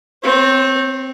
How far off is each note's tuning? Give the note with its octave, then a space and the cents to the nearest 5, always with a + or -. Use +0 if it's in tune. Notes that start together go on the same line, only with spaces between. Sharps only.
C4 +0 C#5 -35